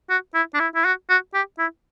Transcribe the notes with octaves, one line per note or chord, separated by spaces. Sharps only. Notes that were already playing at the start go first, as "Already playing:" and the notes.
F#4
E4
D4
E4
E4
F#4
F#4
G4
E4